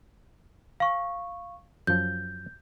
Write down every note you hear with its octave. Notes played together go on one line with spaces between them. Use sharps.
F5 C#6
F#2 F3 G6